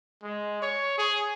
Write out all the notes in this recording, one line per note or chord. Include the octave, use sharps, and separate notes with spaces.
G#3
C#5
G#4